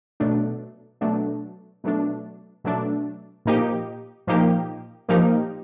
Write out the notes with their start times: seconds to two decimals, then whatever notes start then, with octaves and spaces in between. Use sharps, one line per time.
0.20 B2 F#3 A3 D4
1.01 B2 F#3 A3 D4
1.84 B2 F#3 A3 D4
2.64 B2 F#3 A3 D4
3.45 A#2 F3 A#3 D#4 G4
4.27 A#2 F3 A#3 D#4 G4
5.09 A#2 F3 A#3 D#4 G4